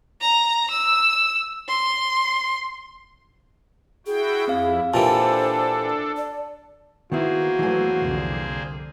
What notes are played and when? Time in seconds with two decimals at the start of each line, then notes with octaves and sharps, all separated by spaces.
0.21 A#5
0.71 E6
1.68 C6
4.07 E4 F#4 G#4 G5
4.48 F2 C4 E4 F5
4.94 A#2 E3 D4 G4 A4 C5 A5
6.17 D5
7.12 D#3 A#3 B3 E4 F#4 G#4 C5
7.59 E3 F#3 A3 B3 G#5
7.99 C2 F2 D3